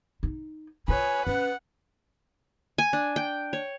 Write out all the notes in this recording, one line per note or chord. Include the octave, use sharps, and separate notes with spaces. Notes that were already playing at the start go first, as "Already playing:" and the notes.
D#4
F4 B4 C#5 G#5
C#4 B4 F#5
G#5
D4
G5
C#5